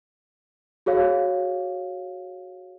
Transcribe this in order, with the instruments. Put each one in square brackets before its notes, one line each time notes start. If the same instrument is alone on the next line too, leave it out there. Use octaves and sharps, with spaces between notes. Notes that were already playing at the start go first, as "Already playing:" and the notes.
[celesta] F#4 G#4 C#5 F5